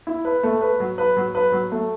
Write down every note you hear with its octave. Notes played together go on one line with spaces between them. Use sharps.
E4
B4
A3
B4
F#3
B4
F#3
B4
F#3
A3